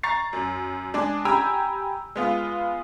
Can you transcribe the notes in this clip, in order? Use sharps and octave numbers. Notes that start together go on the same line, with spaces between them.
A#5 C#6 A6 C7
F#2
G#3 D4 G#4 D5
G4 G5 G#5 A#5 B5 E6
G#3 B3 F4